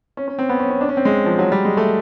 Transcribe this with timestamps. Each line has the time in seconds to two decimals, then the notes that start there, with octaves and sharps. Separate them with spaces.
0.17 C#4
0.28 C#4
0.39 C4
0.49 B3
0.59 C#4
0.70 C#4
0.81 D4
0.89 C#4
0.97 C4
1.05 G#3
1.26 F3
1.39 F#3
1.52 G3
1.65 G#3
1.77 A3